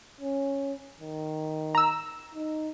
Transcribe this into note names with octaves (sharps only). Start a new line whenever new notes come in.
C#4
D#3
A#5 E6
D#4